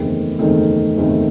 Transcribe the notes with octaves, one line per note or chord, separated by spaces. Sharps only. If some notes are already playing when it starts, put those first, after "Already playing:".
Already playing: F#1 E2 D#3 A3 C4
F#1 E2 D#3 A3 C4
F#1 E2 D#3 A3 C4